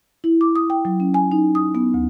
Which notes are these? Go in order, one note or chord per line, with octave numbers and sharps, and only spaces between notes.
E4
D6
D#6
G5
F#3
C#4
G#5
D#4
D#6
B3
D2